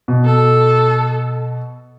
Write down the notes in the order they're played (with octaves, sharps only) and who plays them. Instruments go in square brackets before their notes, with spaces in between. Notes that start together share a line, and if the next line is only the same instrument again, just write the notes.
[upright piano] B2
[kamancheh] A4